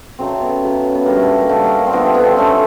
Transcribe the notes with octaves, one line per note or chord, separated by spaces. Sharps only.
C#3 F#3 A3 C4
B3
C#3 F#3 A3
B3
D3 G3 A#3
A3
A#3
A#3
D3 G3 A3
A#3
A#3
C4
D3 F3 A3 B3
C4
B3
C4
D3 F3 A3 C#4